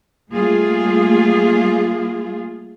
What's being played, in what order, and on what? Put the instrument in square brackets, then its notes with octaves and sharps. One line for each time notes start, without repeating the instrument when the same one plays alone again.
[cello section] G3 A3 A#3 F4 G#4